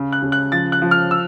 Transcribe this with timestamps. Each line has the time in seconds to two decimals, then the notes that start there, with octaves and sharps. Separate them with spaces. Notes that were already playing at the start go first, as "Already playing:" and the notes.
Already playing: C#3
0.12 F#6
0.22 C#3
0.32 F#6
0.52 F3 A6
0.72 F#6
0.82 F3
0.91 F6
1.11 E6